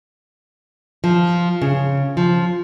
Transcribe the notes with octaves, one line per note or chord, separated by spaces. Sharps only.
F3
C#3
F3